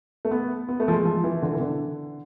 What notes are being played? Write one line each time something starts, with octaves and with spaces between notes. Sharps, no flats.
A3
B3
B3
A3
F3
G#3
F3
E3
D3
E3
D3